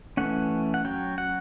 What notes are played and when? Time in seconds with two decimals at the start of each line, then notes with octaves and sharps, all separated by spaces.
0.17 E3 A3 C#4 F#5
0.74 F#5
0.85 F#3 C#4 G5
1.18 F#5